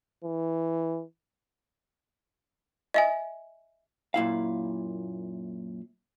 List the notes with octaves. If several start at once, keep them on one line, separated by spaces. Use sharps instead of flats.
E3
D#5 E5 G#5
F#2 A#2 E4 F5